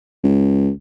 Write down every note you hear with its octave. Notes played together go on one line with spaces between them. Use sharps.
C#2